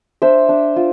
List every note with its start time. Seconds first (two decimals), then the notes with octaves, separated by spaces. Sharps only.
0.22 D4 C5 E5
0.49 D4
0.76 F4